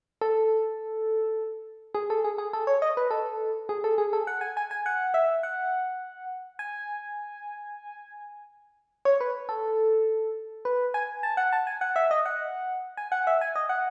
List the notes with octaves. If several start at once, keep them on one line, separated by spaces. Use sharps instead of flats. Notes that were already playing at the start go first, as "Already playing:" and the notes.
A4
G#4
A4
G#4
G#4
A4
C#5
D#5
B4
A4
G#4
A4
G#4
A4
F#5
G#5
G#5
G#5
F#5
E5
F#5
G#5
C#5
B4
A4
B4
G#5
A5
F#5
A5
G#5
F#5
E5
D#5
F#5
G#5
F#5
E5
G#5
D#5
F#5